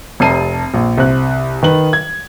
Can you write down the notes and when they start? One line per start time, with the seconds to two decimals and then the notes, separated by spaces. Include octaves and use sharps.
0.20 F1 C3 A5 A#5 C7 D#7
0.74 A#1
0.98 C2 C5 F#6
1.63 D#3 B4 F#7
1.93 G#6